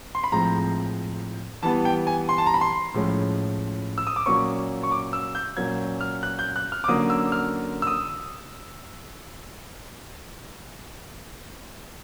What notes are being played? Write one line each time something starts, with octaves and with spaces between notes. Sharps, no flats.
C6
B5
A2 F3 G#3 C4 A#5
E3 G3 B3 A5
G5
G#5
C6
A5
A#5
B5
C6
A2 F3 G#3 C#4
E6
D#6
D6
A#2 F#3 A#3 C#4 C#6
C#6
D6
E6
G6
A#2 F#3 A#3 C#4 G#6
F6
F#6
G6
F#6
F6
D6
D3 F#3 A#3 C#4 D#6
E6
F6
E6
D#6